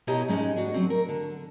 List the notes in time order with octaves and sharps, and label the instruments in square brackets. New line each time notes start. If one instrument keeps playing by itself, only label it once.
[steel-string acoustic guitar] B2 E4 G4 C#5 D#5 A#5
G#2 G#3 C#4 D#4
D4 F#4
F#3 C4
A#4
D3